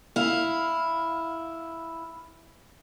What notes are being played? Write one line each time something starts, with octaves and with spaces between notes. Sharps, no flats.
E4 F5